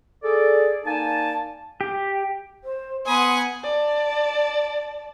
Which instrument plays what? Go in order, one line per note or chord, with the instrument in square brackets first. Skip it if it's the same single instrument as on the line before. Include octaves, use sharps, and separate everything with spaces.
[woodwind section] G#4 A4 D5
A#3 D#4 D5 G#5 A5
[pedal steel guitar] G4
[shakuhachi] C5
[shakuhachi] B3 [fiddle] F#5 G#5 [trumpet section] B5 C6 D#6
[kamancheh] D5 A5